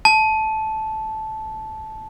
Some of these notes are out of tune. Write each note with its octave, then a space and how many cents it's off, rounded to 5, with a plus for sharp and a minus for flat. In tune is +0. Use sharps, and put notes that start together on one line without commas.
A5 -10